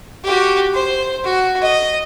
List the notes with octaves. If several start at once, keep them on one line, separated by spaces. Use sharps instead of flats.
F#4 G4
C5
F#4
D#5